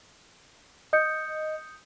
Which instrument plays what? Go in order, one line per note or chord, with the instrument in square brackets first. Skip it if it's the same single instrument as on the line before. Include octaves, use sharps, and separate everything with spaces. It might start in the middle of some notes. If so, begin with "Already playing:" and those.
[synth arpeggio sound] D#5 [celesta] D#6 G6 C#7